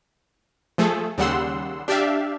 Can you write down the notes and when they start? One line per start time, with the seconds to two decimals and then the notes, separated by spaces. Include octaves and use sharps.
0.78 F3 A3 G#4 A4
1.18 D#2 C#3 G3 F#5 C6 E6
1.88 D4 G4 D5 E5 F5